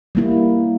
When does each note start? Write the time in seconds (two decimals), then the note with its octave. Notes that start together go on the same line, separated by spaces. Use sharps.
0.15 G3 A#3 E4